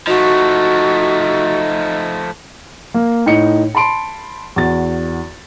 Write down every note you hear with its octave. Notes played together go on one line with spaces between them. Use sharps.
F3 A3 D#4 F#4
A#3
A2 D#4 C#7
A5 B5 C6 D7
E2 F#4 A6